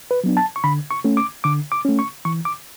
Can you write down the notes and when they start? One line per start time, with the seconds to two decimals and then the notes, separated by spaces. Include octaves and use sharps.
0.11 B4
0.24 F#3 B3 D4
0.37 A5
0.56 C#6
0.64 D3 B5
0.91 C#6
1.04 A3 C#4
1.17 D6
1.44 D3 D6
1.72 D6
1.85 A3 C#4
1.99 C#6
2.25 E3 C#6
2.45 D6